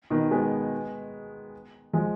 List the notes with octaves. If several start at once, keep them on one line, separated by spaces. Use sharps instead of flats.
B2 D#3
G#3 B3
F3 G#3